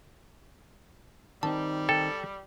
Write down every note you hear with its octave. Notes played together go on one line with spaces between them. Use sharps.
D#3 G3 C4 D#4 A5
A4 G5